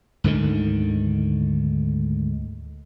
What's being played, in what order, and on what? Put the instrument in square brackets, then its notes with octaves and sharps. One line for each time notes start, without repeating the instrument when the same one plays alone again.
[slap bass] D2 G#2 D3 D#3